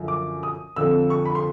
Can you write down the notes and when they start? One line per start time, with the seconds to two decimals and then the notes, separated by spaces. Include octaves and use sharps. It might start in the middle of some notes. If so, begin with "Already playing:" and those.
Already playing: F#2 D3 F3
0.08 D6
0.43 D#6
0.76 F2 D3 F3 E6
1.10 C#6
1.26 B5
1.35 C6